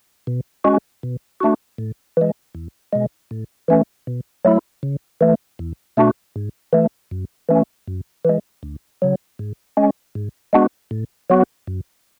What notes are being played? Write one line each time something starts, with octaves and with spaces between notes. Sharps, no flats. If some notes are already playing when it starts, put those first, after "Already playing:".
B2
G#3 C#4 F#4
B2
A3 D4 F#4
A2
E3 G#3
E2
B2 G#3
A2
E3 A3 C#4
B2
F#3 A3 E4
C#3
E3 A3
E2
B2 A3 D4 F#4
G#2
E3 A3
F#2
E3 A3 C#4
F#2
E3 G#3
D2
C#3 F#3
G#2
G#3 C#4
G#2
G#3 B3 D4 F#4
A2
F#3 B3 F#4
F#2